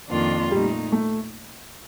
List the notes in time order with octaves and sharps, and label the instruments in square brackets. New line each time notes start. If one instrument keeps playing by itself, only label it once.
[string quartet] F2 D#3 A#3 D4 F4
[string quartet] A#2 A3 D#4 [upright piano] G3
[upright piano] A3